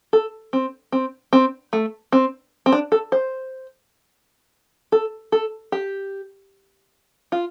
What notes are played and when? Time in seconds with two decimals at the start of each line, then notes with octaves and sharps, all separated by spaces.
0.13 A4
0.53 C4
0.92 C4
1.33 C4
1.73 A3
2.12 C4
2.66 C4
2.72 D4
2.92 A4
3.12 C5
4.92 A4
5.32 A4
5.72 G4
7.32 F4